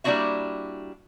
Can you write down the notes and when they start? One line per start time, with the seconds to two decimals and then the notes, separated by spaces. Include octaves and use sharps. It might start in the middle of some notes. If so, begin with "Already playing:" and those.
0.04 G3 A#3 D4 E4 F#4 E5